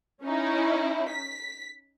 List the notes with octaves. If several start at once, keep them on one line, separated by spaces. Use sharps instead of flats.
C#4 D#4 E4
B6